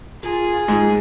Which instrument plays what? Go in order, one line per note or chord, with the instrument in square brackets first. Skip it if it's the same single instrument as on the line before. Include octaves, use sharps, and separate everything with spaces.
[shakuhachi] F4 [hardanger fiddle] G#4 [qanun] A#4
[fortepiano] G#2 [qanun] G#3